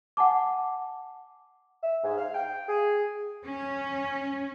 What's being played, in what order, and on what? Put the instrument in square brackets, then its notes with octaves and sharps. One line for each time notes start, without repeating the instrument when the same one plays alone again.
[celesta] F#5 G#5 A5 D6
[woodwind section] E5
G#2
F5
G5
G#4
[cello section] C#4